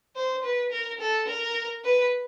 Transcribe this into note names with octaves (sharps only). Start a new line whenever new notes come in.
C5
B4
A#4
A4
A#4
B4